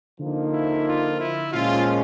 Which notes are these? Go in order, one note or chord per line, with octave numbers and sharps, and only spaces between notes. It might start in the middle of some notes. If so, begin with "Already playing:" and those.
D3 F3 A#3 D#4
E4
F4
E4
A#2 F3 G#3 C#4 F4